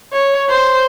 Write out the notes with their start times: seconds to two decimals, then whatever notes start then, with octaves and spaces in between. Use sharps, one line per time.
0.13 C#5
0.49 C5